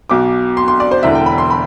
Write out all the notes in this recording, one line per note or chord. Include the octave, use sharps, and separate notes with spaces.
B1 B2 D6
C6
C6
D5
C5
E1 E2 D3 E5
G5
B5
C6
B5